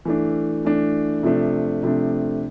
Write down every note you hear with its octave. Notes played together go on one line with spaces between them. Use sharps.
E3 A3 D4
E3 A3 D4
C3 F3 A3 D4
C3 F3 A3 D4